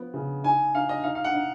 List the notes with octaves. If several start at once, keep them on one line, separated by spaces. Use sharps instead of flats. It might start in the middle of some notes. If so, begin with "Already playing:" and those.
Already playing: F3 B3
C#3
D#4 G#5
D#4 F5
D#5
D#4 F5
F5
F#5
D#4